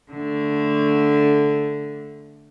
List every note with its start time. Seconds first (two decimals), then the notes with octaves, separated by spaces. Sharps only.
0.12 D3 A3